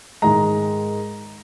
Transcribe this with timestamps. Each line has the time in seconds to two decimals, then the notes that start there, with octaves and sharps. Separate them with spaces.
0.22 G#2 D#3 G#3 A#5